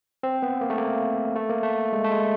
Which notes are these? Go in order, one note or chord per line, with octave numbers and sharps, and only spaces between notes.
C4
B3
A#3
A3
A#3
A3
A#3
A3
G#3
A3
G#3